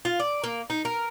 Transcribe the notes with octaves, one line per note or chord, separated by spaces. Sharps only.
F4
D5
A#3
D#4
A#4